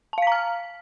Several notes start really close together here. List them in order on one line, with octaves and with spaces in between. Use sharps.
A5 F5 B6 A#5 F6